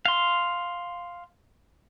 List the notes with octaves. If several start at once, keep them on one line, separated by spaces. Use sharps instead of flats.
F5 C6